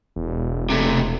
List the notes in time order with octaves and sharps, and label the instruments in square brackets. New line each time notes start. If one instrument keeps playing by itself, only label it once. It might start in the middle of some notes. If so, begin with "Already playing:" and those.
[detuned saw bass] E1
[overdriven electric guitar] C3 A3